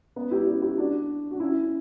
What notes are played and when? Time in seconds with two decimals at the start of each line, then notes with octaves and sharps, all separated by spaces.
0.16 B3
0.31 E4 G4
0.47 G4 B4
0.62 E4 G4
0.78 D4 F#4
1.31 F#4
1.40 C#4 E4